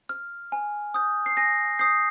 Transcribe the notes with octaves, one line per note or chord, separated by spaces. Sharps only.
F6
G#5
D#6 G6
C7
G#5 A#6
D#6 G6 C7